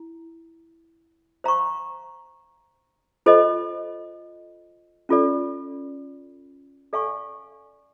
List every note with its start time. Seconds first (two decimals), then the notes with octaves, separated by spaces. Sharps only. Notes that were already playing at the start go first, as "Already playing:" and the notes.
Already playing: E4
1.44 C5 F5 A#5 C#6
3.26 F4 A4 C5 D#5
5.09 C#4 F4 A4 D5
6.93 A4 D5 F5 G#5 C#6